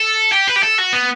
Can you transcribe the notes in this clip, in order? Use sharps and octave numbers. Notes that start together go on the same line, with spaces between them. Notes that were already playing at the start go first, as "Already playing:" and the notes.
Already playing: A4
G4
B4
G4
A4
F#4
B3